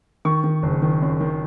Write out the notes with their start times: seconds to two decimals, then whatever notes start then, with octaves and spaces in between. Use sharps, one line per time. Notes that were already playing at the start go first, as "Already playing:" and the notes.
0.25 D#3 C#6
0.44 D#3
0.63 F#1
0.82 D#3
1.02 F#2
1.21 D#3